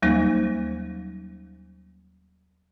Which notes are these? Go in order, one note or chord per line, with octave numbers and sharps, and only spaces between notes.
D#2 F#3 G3 A#3 D#4 C5